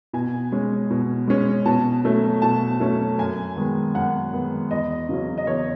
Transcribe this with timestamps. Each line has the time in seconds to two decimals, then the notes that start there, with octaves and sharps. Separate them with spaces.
0.13 B2 G#5
0.52 G#3 C#4
0.91 B2
1.27 G#3 C#4
1.66 B2 A5
2.04 F#3 A3 C#4
2.42 B2 A5
2.80 F#3 A3 C#4
3.18 F#2 G#5
3.56 D#3 G#3 B3
3.95 F#2 F#5
4.33 D#3 G#3 B3
4.71 E2 D#5
5.09 C#3 F#3 C#4
5.38 D#5
5.47 E2 C#5